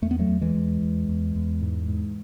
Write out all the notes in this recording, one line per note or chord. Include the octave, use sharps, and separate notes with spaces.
E2 A3
B3
F#3 A3
E2
E3 G#3
E2
E2
E2
E2
G#2
G#2